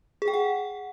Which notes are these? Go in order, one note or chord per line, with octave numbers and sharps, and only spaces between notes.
G#4
G5
F#5